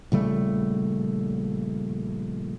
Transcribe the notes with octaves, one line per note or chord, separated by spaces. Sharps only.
A#1 C#3 G3 A3